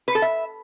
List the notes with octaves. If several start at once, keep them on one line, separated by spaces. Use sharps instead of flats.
B4
A4
E5